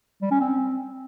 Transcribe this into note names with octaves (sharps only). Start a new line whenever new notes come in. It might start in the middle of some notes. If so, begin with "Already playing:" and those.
G3
C#4
C4